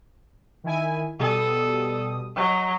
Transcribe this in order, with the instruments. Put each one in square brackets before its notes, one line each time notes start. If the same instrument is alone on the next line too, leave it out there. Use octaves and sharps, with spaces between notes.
[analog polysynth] D#3 E4 G#5
[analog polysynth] B2 G3 D#6 [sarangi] A4
[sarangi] F#3 [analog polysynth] D#5 A#5